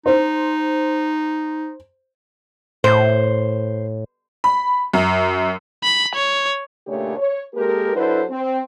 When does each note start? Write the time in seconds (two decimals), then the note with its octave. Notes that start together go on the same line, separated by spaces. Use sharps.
0.06 D#4 C5
2.84 A2 C5
4.44 B5
4.94 F#2
5.84 B5
6.15 C#5
6.87 A#2 C#3 A3 D4 G4 C#5
7.17 C#5
7.54 G#3 A#3 G4 A4 A#4
7.93 F#3 D4 E4 A4 B4 C5
8.30 C4